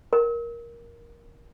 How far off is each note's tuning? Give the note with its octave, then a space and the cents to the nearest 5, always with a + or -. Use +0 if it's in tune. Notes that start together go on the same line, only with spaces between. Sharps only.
A#4 +15